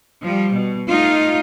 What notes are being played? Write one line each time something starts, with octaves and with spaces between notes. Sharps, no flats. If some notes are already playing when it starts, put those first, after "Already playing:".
F3 G3
B2
A3 D#4 F4